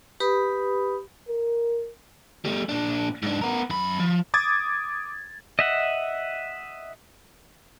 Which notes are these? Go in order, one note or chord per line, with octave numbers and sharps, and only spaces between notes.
G4 B4 B5 D#6
A#4
G3 A3
A#2 D4
G#2 D4
B3 A#4
F#2 B5
F3
D6 D#6 G#6 A6
D#5 E5 F#5